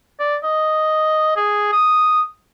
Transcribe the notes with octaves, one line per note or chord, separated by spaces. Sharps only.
D5
D#5
G#4
D#6